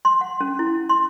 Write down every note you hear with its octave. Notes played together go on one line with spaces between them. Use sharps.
C6
F#5
C#4
E4
C6